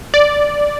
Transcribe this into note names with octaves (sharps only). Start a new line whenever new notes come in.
D5